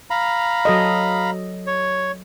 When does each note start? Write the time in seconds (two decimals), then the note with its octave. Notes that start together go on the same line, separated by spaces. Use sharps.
0.10 F5 A#5 B5
0.65 F#3 A4 D#5
1.67 C#5